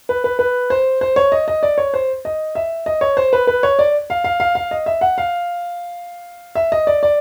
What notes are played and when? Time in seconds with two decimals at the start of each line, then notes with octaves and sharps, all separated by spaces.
0.09 B4
0.24 B4
0.39 B4
0.70 C5
1.01 C5
1.16 C#5
1.32 D#5
1.48 D#5
1.63 D5
1.78 C#5
1.94 C5
2.25 D#5
2.55 E5
2.86 D#5
3.01 C#5
3.17 C5
3.33 B4
3.47 B4
3.63 C#5
3.79 D5
4.10 F5
4.24 F5
4.40 F5
4.55 F5
4.71 D#5
4.86 E5
5.01 F#5
5.18 F5
6.55 E5
6.72 D#5
6.87 D5
7.03 D5